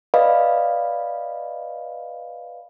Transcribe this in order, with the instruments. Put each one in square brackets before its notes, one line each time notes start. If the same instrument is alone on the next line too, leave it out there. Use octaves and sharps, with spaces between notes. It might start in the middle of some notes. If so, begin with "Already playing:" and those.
[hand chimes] B4 D5 D#5 F5 B5